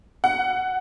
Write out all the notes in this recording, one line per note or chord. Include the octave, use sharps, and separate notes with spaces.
F#5